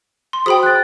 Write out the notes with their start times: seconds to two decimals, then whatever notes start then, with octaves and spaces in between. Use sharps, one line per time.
0.33 C6
0.46 F#4 G#4 C5 G5 B5 D#6
0.63 F#6 A6